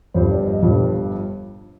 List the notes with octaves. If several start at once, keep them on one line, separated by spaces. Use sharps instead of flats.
G1 G2 F3 C5
D5
D#5
G1 G2 F3